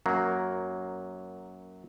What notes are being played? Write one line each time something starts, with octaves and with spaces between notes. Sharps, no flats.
F#2 F#3 A#3